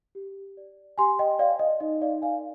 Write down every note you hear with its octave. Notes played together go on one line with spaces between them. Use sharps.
G4
D5
G4 G#5 C6
D#5 G5
C5 D5 F5
D#5
D#4 D#5
D5 F5
A#4 D5 F5 G#5